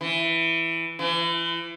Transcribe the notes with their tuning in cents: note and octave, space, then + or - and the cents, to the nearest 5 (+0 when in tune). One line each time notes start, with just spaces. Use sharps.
E3 +5
E3 +35